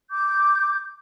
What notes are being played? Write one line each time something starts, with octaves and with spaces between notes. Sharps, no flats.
D6 G6